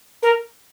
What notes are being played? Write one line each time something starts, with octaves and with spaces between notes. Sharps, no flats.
A#4